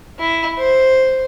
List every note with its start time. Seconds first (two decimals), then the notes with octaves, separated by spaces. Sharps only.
0.19 E4
0.58 C5